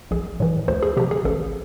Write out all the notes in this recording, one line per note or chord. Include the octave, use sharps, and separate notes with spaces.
A#1 G#4
A2 E3
D2 C5
G#4
C3 F3 G4
G#4
A1 A4